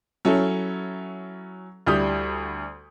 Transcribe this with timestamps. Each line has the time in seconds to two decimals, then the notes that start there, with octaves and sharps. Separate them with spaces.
0.25 F#3 C#4 E4 A4
1.87 D2 G3 D4 E4 D#6 G6